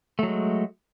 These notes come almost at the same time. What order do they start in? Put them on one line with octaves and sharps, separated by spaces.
A3 F#3 G#3